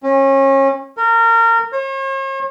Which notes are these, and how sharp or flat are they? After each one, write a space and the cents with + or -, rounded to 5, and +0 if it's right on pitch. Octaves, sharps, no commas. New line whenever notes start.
C#4 -30
A#4 -25
C#5 -45